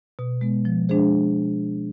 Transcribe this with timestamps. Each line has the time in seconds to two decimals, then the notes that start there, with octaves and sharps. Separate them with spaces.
0.19 B2
0.41 G#3 B3
0.65 F3
0.89 G#3 D4 G#4 C5